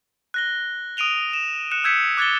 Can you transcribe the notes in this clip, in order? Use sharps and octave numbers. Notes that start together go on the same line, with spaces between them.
F#6 A#6 G7
D#6 D7 D#7 F7 G7
E7
F#6 C#7 E7
E6 G6 G#6 B6 C#7
D6 F#6 G#6 A6 C#7 G7